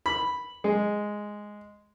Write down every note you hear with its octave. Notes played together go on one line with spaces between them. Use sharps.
B5
G#3